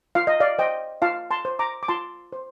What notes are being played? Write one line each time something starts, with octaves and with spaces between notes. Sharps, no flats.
F4 F5
D#5
D5 F5
C5 D#5 G5
F4 F5 A5
A5 C6
C5
A#5 D6
D6
F4 A5 C6
C5